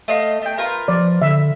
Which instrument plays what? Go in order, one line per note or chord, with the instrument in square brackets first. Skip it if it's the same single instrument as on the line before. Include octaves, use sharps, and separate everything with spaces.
[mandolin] A3 D#5 F5
A3 G5
F4 A#4 B4
[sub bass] F3 [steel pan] D5
[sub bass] D3 [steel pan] E5